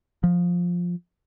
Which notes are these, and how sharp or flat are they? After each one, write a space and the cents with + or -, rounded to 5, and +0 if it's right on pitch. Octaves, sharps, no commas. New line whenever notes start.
F3 +10